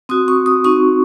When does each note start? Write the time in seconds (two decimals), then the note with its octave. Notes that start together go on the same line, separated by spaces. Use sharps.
0.09 C4 F#4 D#6
0.28 C#6
0.46 D#6
0.65 C4 D#4 F#4 C#6